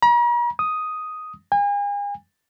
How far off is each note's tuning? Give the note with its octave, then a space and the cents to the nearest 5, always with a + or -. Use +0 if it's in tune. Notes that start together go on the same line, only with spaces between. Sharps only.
A#5 +45
D#6 +5
G#5 -40